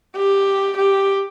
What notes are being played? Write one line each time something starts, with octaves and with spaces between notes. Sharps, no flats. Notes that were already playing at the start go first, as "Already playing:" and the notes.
G4
G4